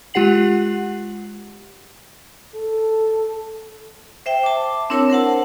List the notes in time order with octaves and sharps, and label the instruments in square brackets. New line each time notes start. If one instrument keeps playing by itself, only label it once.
[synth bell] G#3 F4 G4 F#5 C7 F#7
[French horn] A4
[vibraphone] C5 E5 G5
A5 D6
C4 D4 E4 A#4 C#5
A#4 C5 F#5 A5